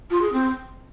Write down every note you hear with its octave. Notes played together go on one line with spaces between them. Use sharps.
F4
G#4
C4